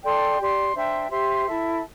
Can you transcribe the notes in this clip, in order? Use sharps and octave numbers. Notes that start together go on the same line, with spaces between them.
A4 D5 G5 C6
G4 D5 C6
D4 C5 E5 G5
G4 C5 E5 C6
E4 A4 E5